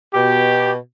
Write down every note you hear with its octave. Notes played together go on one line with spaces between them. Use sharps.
B2 G4